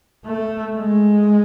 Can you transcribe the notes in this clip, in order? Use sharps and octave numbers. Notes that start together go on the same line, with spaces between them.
A3
G#3